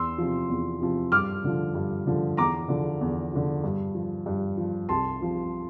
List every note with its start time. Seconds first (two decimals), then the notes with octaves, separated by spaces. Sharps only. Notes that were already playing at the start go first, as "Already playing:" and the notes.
Already playing: E2 C6 E6
0.18 C3 F3
0.50 E2
0.81 C3 F3
1.12 G2 D6 F6
1.44 D3 F3
1.75 G2
2.07 D3 F3
2.37 E2 A#5 D6
2.69 D3 F3
3.01 E2
3.32 D3 F3
3.64 G2
3.94 F3
4.26 G2
4.57 F3
4.89 C2 A5 C6
5.20 C3 F3